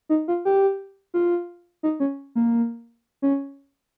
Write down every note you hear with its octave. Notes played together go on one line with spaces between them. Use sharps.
D#4
F4
G4
F4
D#4
C#4
A#3
C#4